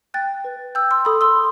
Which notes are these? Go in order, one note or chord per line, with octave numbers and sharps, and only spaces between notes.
G5 F#6 A6
B4
G5 E6 G6
C6 E6
A4 B5 D#6
C6 E6